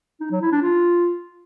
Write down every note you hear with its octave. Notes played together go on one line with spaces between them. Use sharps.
D#4
F#3
E4
D4
F4